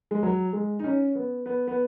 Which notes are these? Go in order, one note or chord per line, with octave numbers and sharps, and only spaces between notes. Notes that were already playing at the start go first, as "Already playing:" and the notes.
G#3
F#3
G#3
D#4
C#4
B3
B3
B3